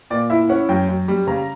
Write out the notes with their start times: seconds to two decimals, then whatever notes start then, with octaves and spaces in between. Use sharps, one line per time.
0.10 A#2 D5
0.30 E4 E5
0.49 C#4 F#5
0.69 F#2 G5
0.89 F#2
1.08 G3
1.27 C#3 A#5